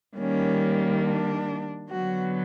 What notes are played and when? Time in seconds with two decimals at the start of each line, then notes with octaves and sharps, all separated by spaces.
0.17 D#3 G3 A#3 C#4
1.04 D4
1.90 D3 F#3 B3 F#4